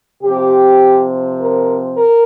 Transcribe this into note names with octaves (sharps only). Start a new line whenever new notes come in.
C3 F3 C4 G4
A#4
A#4